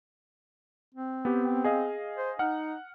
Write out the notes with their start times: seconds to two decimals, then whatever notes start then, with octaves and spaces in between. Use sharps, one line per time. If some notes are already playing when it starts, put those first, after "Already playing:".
0.94 C4
1.25 B3 G4
1.64 G#4 D#5 F5
2.16 C5
2.39 D#4 F#5 F6